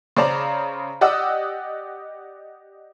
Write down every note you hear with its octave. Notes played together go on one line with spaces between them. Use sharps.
C#3 C5 D5 A#5
G4 D5 D#5 F#5 D#6 E6